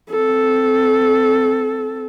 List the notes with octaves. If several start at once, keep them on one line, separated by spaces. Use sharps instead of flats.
C4 A4